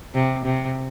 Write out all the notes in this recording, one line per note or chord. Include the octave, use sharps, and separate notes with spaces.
C3
C3